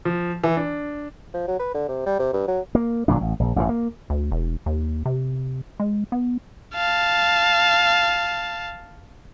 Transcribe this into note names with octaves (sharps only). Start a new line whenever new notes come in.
F3
E3
D4
F3
F#3
B4
D3
C3
G3
C3
G2
F#3
A#3
G1 A#2 F#3 D4
A1
A#1
A1 G2 D3 E3
A#3
D2
E1
D#2
C3
G#3
B3
F5 A5